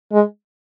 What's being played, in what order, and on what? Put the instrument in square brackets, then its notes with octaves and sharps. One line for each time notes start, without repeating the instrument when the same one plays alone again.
[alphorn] G#3